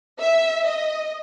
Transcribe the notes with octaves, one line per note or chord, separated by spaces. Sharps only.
E5
D#5